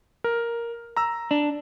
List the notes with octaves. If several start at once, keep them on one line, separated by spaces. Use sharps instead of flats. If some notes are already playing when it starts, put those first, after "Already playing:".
A#4
A#5 E6
D4